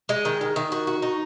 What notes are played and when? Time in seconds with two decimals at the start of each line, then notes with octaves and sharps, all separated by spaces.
0.09 G#3
0.25 D#3
0.41 D#3
0.56 D#3
0.72 F#4
0.87 F#4
1.02 D#4